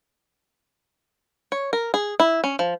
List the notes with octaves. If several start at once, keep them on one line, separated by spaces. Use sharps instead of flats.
C#5
A#4
G#4
E4
C#4
F3